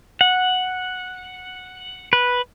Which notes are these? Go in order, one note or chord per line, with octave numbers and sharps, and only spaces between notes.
F#5
B4